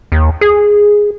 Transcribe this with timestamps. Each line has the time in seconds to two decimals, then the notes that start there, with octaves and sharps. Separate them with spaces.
0.12 D#2
0.41 G#4